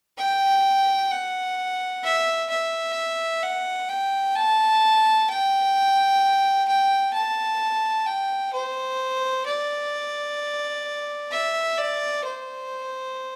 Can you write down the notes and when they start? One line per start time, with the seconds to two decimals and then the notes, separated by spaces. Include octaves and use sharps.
0.18 G5
1.11 F#5
2.04 E5
2.50 E5
3.43 F#5
3.89 G5
4.35 A5
5.28 G5
6.68 G5
7.13 A5
8.07 G5
8.53 C5
9.46 D5
11.32 E5
11.77 D5
12.25 C5